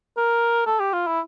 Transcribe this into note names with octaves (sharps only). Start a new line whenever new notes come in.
A#4
A4
G4
F4
E4